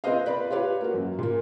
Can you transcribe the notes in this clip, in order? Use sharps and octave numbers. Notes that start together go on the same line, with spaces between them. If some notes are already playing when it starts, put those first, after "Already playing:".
C4 F4 B4 C5 D#5 F5
B4 D5 B5
F4 G4 B4 C#5
A#3 F#4
F#2
A#2 A#3